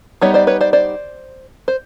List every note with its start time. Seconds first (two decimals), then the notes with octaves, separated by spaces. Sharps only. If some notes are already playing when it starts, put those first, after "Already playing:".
0.22 G3 B3 D#4 C#5 D#5
0.34 C5 D5
0.47 B4 C#5
0.61 C5 D5
0.73 C5 D5
1.68 C5